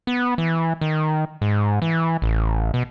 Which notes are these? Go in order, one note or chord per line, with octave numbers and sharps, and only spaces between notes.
B3
E3
D#3
G#2
E3
A1
B2